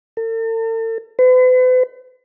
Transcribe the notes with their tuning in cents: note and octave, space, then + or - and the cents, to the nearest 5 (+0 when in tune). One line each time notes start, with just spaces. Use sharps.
A4 +45
B4 +45